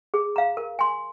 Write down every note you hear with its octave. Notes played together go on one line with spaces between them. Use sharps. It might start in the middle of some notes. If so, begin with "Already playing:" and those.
G#4
F5 A#5
A#4
G#5 C6